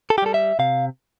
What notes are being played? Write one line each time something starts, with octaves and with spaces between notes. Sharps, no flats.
A4
G4
G3 A4
E5
C3 F5